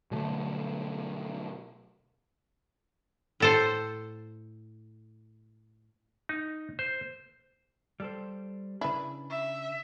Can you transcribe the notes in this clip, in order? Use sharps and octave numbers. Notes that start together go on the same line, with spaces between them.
B2 D3 F#3 A3
A2 A4 C5
D#4
C5
G3 A4 C5
C#3 D4 E4 B4
E5